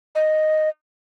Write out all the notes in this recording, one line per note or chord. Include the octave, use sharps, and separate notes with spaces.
D#5